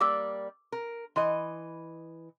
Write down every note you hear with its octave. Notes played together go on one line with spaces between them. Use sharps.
G3 A#3 D5 D6 E6
A#4
E3 D#5 C6